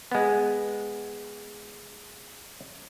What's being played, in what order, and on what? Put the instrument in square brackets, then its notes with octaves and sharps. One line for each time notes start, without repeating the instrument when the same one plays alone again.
[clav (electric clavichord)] G#3 B3